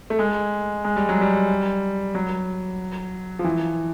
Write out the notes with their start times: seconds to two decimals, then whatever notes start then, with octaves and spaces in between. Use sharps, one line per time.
0.10 A3
0.19 G#3
0.84 G#3
0.96 G3
1.09 F#3
1.21 G3
2.15 F#3
3.39 F3
3.44 E3